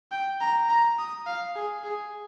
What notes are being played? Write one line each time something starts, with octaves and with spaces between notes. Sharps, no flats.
G5
A#5
A#5
D#6
F5
G#4
G#4